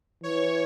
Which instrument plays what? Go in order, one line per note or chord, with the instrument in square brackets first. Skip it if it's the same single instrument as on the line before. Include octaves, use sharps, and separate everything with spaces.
[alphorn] E3 [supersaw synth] C#5